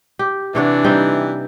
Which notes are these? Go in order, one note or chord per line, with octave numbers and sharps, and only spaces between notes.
G4
C3 E3 D4 C#5 F#5
G3 C4 D#4